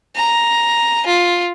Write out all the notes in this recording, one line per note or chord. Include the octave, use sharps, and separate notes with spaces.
A#5
F4